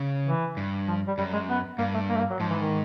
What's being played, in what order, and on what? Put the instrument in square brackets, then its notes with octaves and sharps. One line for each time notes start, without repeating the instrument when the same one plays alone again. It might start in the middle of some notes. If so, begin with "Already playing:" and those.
Already playing: [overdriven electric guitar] C#3
[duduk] E3
[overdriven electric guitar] G2
[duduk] F3
G3
[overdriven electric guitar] F#2 [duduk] G3
[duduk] G#3
B3
[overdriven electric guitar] G2 [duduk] A#3
[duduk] A3
A#3
A3
A#3
F#3
[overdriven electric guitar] G#2 [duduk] F3
[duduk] E3
D#3